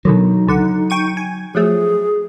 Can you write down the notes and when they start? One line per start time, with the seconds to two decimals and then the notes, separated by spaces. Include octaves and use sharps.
0.05 B2 D3 D#3 F#3 D#4
0.47 C#2 D3 F#5
0.90 G5 C#6 D#7
1.17 G#5
1.55 F3 F#3 A3 G#4